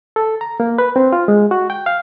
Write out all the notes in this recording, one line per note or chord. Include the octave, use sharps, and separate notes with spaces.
A4
A#5
A#3
B4
C4
F4
G#3
F#4
G5
F5